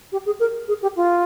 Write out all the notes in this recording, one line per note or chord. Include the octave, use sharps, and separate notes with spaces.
G4
G#4
A#4
G#4
G4
F4